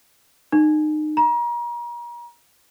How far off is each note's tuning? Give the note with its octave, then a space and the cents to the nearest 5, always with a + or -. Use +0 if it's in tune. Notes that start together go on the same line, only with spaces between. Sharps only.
D#4 -30
A#5 +35